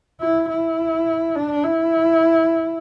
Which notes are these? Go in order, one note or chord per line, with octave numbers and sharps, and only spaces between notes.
E4
E4
D4
E4